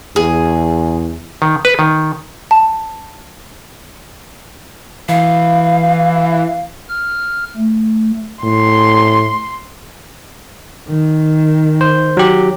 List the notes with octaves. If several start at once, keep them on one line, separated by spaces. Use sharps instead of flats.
E2 G#4
D#3
B4
D#3
A5
E3 F5
F6
A3
A2 C6
D#3
C5
F#3 G4